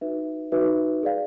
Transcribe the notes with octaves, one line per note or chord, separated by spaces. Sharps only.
D#4 F#4 B4 E5
D#4 F#4 B4 E5
G#4 B4 D5 F5